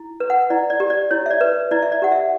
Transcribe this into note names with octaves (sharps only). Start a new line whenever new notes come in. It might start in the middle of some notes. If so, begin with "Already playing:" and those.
Already playing: E4
B4
F#5
E4 D5
D5
G4
D5
E4 C#5
E5
D5
B4
E4 D5
E5
D5
G4 F#5
E5